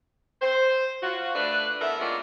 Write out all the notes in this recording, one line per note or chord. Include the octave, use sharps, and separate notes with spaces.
C5
F4 F#4
A3 D4 B4
E3 B3 A4 A#4 E5
G#3 A#3 C#4 D4 F4 A#4